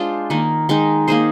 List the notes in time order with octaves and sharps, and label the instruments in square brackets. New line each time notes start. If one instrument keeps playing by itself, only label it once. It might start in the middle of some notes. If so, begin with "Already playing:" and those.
Already playing: [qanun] G#3 D4 F4 C5
D#3 A#3 D#4
D#3 G#3 D#4
A#3 D#4 G#4 C5